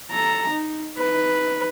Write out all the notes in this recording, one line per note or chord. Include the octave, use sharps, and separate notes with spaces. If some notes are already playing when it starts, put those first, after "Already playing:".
A4 A#5
D#4
D#4 B4